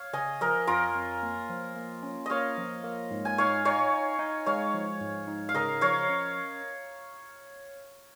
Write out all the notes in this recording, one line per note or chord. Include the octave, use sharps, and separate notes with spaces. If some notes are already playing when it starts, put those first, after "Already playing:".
Already playing: C#5 F5
C#3 D#5 G#5
F3 A#4 D#5
F2 F4 A#4
F2
A#3
F3
A#3
C#4
A#3 C#5 D#5 F5
F3
A#3
G#2
G#5
D#4 C#5 F5
D#4 C#5 F5
D#4
D#4
G#3 C#5 F5
F3
G#2
D#4
F5
C#3 A#4 D#5
F3 C#5 F5
C#4